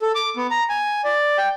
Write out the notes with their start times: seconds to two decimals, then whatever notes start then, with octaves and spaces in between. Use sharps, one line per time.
0.02 A4
0.15 D6
0.37 B3
0.51 A#5
0.69 G#5
1.04 D5
1.38 G5